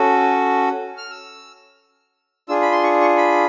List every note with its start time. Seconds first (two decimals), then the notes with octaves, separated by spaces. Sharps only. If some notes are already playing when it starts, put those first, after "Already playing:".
Already playing: C#4 F#4 A4
0.98 F6
1.11 E6
2.48 D4 F4 G#4 E6
2.62 B5
2.72 C6
2.84 C#6
3.01 C#6
3.17 B5